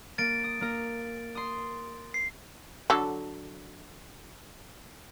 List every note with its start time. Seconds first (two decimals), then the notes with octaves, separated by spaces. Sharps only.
0.18 A#3 A6 D7
0.44 D#6
0.61 A#3 A#4
1.35 C6 D#6
2.14 C7
2.90 D3 F#3 A4